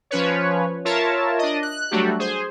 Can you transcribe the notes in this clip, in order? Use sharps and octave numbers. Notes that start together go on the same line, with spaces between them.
F3 C#4 B4 C#5
F4 A#4 C#5 E5 A5
D4 D#5
F#6
F#3 G3 A3 D4 F#4 G4
G#4 C5